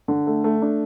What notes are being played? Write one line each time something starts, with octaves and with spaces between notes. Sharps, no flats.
D3
A3
A3
D4